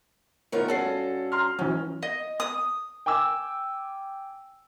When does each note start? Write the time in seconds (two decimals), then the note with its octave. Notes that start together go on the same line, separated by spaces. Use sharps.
0.52 D#3 A3 B3 F4 A#4 C#5
0.68 G2 C#4 F#4 A4 C7
1.32 A#5 C6 F6
1.59 G#2 E3 F#3 C#4
2.03 D#5
2.40 D#6
3.06 G5 G#5 D6 E6